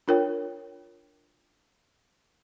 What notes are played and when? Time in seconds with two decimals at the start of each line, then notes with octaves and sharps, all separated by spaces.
0.08 D4 F4 A#4 C#5 G5